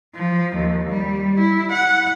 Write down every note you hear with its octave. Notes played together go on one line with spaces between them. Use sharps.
F3
D#2
G3
E4
F#5